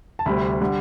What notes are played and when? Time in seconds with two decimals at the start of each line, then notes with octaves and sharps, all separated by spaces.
0.19 A5
0.26 D2 C3 G3 B5
0.61 D3 G3